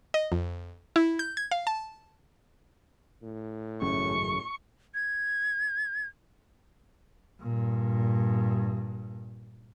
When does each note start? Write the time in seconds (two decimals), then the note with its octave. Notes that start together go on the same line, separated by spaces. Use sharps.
0.14 D#5
0.32 F2
0.96 E4
1.19 G6
1.37 G#6
1.51 F5
1.67 A5
3.22 A2
3.82 G#1 F#2 C#3 C#6
4.94 G#6
7.41 G2 A#2